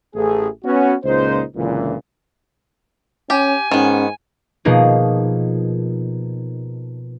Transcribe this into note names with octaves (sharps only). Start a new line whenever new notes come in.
A1 A3 G#4
B3 C#4 F#4
C#2 A#2 G#3 D#4 C5
C#2 A#2 D3 E3
C#4 G4 G#5
G#2 D#3 B3 C#4
B2 F3 A#3 D#4 G#4